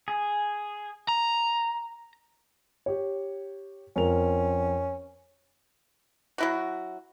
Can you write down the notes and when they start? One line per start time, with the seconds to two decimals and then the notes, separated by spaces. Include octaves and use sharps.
0.08 G#4
1.08 A#5
2.86 G4 C#5
3.96 F2 C#4 A#4 F7
6.38 F#3 E4 F#4